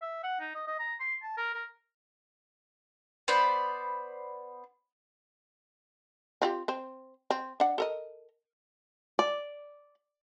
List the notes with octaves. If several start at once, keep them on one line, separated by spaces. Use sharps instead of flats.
E5
F#5
D#4
D#5
D#5
A#5
C6
A5
A#4
A#4
B3 C5 D5 B5
C4 F4 G4
C4 C5
C4
D4 F#5
A4 A#4 D#5
D5